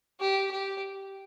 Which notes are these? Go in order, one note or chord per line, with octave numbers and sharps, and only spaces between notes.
G4
G4